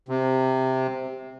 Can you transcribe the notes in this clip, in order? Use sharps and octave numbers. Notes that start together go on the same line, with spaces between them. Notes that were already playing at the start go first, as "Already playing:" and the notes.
C3